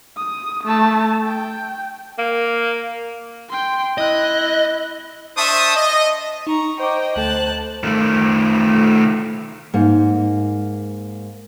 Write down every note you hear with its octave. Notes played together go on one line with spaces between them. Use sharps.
D#6
A3 A5
G5
A#3
G5 C6
E4 D#5 F#6
D4 C5 E5 A5 C#6 D#6
D#5
D#4 A#5 C#6
C5 D#5 G5 C#6 D6
D2 A3 A4 A5 F#6
D#3 A3
G#2 A#3